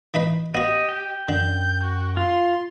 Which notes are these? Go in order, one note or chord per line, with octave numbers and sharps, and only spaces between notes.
E3 D#4 B4
B3 F#4 G4 D#5
G5
F#2 D3 G6
F#4
F4 C6